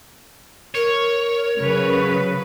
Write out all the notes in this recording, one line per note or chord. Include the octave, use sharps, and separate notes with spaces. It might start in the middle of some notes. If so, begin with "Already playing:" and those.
A#4 C#5
C#3 F#3 B4